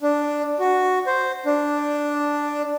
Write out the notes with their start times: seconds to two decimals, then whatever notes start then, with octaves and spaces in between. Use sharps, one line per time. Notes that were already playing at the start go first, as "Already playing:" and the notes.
0.02 D4
0.60 F#4
1.07 C5
1.46 D4